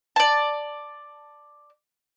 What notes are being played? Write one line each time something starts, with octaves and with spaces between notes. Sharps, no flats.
D5 A5